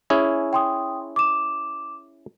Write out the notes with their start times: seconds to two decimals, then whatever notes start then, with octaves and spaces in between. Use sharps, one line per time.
0.10 C#4 E4 G#4
0.53 G5 C6 D#6
1.16 D6 E7